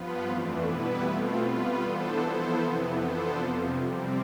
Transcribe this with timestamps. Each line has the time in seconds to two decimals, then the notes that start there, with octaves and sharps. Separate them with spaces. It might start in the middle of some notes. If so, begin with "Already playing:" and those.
Already playing: G2 F3 B3 F4 B4
0.24 F2 E3 A3 D4
0.64 B2 G3 B3 E4 B4
1.03 B2 A3 C4 F4
1.41 G3 B3 F4 B4
1.81 E3 B3 D4 A4 C5
2.19 F3 B3 E4 A4 C5
2.58 F2 C3 E3 B3
2.99 F3 B3 D4 A4 C5
3.37 F2 C3 F3
3.76 C3 G3 C4